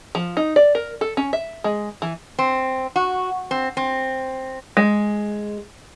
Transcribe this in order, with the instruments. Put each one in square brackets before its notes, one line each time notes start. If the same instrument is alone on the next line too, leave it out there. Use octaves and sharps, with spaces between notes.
[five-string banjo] F3
D#4
D5
A#4
A4
C#4
E5
G#3
E3
[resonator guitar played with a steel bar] C4
F#4
C4
C4
[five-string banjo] G#3